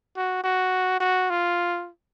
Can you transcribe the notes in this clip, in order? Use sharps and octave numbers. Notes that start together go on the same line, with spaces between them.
F#4
F#4
F#4
F4